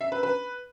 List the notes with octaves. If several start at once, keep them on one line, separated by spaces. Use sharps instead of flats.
E5
B4
B4